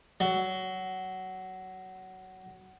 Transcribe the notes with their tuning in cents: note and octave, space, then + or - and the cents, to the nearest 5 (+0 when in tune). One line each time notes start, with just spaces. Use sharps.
F#3 +15